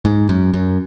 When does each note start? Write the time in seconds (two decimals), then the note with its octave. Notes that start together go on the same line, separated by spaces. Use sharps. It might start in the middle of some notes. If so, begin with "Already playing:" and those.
0.05 G#2
0.29 F#2
0.54 F#2